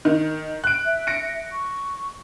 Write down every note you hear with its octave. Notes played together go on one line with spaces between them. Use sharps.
D#3
F#6 D7
E5
A#6 C#7 D7
C#6